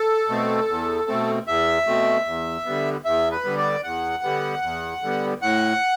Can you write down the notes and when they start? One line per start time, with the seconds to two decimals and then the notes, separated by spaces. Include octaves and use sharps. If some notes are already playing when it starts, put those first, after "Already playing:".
Already playing: A4
0.29 B2 A3 C4
0.68 E2
1.08 B2 A3 C4
1.47 E2 E5
1.87 B2 A3 C4
2.26 E2
2.65 D3 G3 B3
3.05 E2 E5
3.31 B4
3.44 D3 G3 B3
3.58 D5
3.84 E2 F#5
4.23 D3 G3 B3
4.63 E2
5.02 D3 G3 B3
5.42 A2 F#5